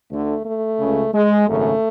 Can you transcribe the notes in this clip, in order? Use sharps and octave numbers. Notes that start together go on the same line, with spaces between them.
D2 D3 A3
A3
C#2 C#3
G#3
G#1 F#2 C#3 A3